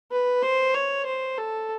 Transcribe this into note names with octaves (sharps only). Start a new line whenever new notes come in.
B4
C5
C#5
C5
A4